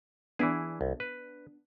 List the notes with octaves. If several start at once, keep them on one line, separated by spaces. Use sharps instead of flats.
E3 B3 D4 E4 G#4
C2
B4